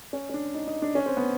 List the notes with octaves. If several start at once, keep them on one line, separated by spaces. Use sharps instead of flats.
C#4
C#4
D4
D#4
D#4
D4
C#4
C4
B3